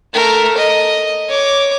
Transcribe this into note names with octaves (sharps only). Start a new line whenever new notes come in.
A3 A#4
D#5
C#5 D6